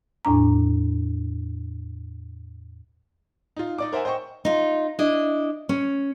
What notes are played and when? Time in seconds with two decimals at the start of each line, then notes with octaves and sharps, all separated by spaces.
0.25 E2 A2 D4 A#5
3.57 D#4 F4
3.78 D#4 D5 D6
3.92 A#4 C5 E5 F#5 G#5
4.05 C5 D#5 G5 C#6
4.45 D#4 F4
4.99 D4 E4 D#5
5.69 C#4